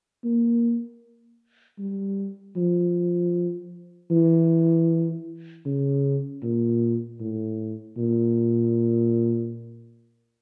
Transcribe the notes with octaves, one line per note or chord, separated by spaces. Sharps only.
A#3
G3
F3
E3
C#3
A#2
A2
A#2